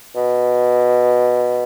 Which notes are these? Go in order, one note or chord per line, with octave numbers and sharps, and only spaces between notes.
B2